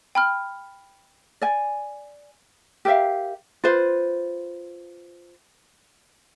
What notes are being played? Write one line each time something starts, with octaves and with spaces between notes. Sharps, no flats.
G5 B5 F6
D5 G#5
G4 A#4 E5 F5
F4 B4 C5